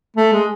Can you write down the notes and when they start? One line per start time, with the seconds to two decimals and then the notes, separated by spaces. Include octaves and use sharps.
0.17 A3
0.33 G#3